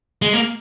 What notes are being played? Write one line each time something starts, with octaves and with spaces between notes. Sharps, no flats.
G#3
A#3